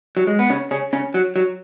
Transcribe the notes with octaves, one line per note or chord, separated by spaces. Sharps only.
F#3
G#3
B3
C#3 C#4
C#3 C#4
C#3 C#4
F#3
F#3